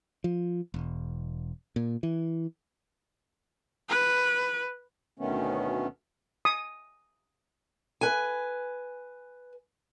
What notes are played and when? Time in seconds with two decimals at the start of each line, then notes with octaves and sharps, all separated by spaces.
0.24 F3
0.74 E1
1.76 A#2
2.03 E3
3.89 B4
5.19 D2 B2 D#3 A3 B3 C#4
6.45 D#6
8.01 B4 G#5